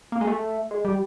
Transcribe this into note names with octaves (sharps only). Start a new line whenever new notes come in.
A#3
G#3
A3
G#3
G3